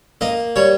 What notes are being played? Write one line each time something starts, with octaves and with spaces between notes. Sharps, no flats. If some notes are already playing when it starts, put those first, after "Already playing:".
A#3 D#5
G3 C#5